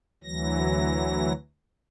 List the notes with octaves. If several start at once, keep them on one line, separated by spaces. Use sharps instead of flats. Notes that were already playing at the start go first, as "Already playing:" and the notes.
D2 E3 F#3 A#6